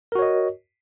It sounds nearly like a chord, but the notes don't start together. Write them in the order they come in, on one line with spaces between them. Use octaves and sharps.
A#4 F#4 C#5 D#5